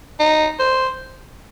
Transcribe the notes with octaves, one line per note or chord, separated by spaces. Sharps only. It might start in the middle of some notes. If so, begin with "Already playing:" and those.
D#4
C5